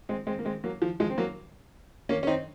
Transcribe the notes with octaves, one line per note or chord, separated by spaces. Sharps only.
G#3 C4
G#3 C4
A#3
G#3 C4
F#3 A#3
F3
F3 G#3
C4
F#3 A#3
A#3 C#4
C#4
C4 D#4